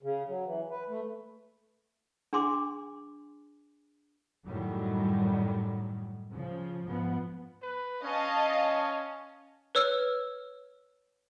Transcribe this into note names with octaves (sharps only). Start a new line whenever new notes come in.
C#3
F#3
E3
B4
A3
D4 G#4 G#5 C6 D6
F#2 A2 D#3 F#3 G3
C#3 F3
G#2 F3 B3
B4
C#4 D#5 F5 A5
B4 C#5 E6 F6